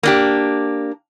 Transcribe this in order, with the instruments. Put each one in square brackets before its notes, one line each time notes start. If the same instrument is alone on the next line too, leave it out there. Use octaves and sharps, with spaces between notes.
[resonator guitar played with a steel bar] A#3 D4 G4